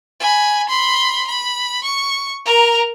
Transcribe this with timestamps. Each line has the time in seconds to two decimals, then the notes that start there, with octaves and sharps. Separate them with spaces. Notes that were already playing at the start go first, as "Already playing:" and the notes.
0.20 G#5 B5
0.68 B5 C6
1.27 B5
1.84 C#6
2.46 A#4 A#5